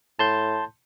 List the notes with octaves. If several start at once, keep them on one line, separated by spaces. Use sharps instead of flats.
A2 A5 C6 G6